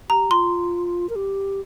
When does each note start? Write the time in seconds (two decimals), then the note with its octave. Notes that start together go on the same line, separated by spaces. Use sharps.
0.09 G4 A#5
0.31 F4 C6
1.09 A#4
1.16 G4